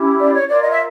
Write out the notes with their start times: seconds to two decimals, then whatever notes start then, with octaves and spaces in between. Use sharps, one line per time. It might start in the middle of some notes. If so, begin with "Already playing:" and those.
Already playing: C#4 E4 G4
0.18 D5
0.33 C#5
0.47 F4 A#4 C#5 D5
0.62 D#5
0.70 E5